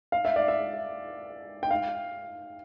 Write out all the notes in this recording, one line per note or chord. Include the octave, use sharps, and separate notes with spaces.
F5
E5
D5
E5
G5
F5